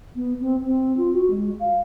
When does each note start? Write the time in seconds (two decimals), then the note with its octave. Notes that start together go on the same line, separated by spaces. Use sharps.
0.15 B3
0.40 C4
0.65 C4
0.97 F4
1.13 F#4
1.30 G#3
1.59 F5